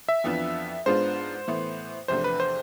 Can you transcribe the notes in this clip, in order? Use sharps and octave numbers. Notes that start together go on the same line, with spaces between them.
E5
F2 E3 B3 D4 F4
G#2 G#3 B3 D4 F4 C5
A2 E3 B3
E2 C3 F3 A3 D4 C5
B4
C5